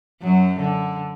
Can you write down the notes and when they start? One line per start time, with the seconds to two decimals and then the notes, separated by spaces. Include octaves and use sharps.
0.22 F#2 F#3
0.59 D3